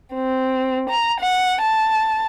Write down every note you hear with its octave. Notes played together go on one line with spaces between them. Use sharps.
C4
A#5
F#5
A5